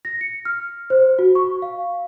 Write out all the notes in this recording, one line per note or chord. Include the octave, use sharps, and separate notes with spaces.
A#6
C#7
F6
C5
F#4
C#6
F5